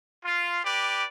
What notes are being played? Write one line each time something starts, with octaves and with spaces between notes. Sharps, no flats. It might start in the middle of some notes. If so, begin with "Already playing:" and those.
F4
G4 B4 D5